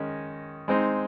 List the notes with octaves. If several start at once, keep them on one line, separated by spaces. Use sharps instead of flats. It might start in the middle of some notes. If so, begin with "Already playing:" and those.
Already playing: D#3 G#3 C#4
G#3 C4 D#4